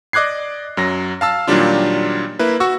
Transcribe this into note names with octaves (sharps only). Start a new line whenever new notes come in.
D5 D#5 D6 F#6 G#6 C7
F#2 F#3 A#6
F5 A5 E6
A#2 D#3 F#3 G3 D4 F4
A#3 E4 B4
F#4 C#6 E6